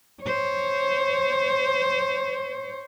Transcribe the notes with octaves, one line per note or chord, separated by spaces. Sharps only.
C5 C#5